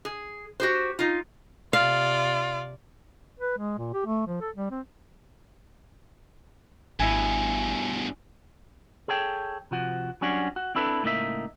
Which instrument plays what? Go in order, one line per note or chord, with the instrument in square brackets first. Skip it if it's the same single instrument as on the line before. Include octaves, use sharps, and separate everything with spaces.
[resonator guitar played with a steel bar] G#4
F#4 G4 C5
D#4 F4
[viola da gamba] C3 D5 [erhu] F4 [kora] F5
[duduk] B4
G#3
A#2
G4
A3
F3
A4
G3
C4
[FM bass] G#1 [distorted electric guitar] G2 B2 [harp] E4 G#5
[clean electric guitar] G#4 A4 C#5 G5
C3 F3 F#4
F#3 G3 C#4 D4 F#4
F#4
C4 D4 E4 A4 B4
C#2 A2 A#3 D#4 E5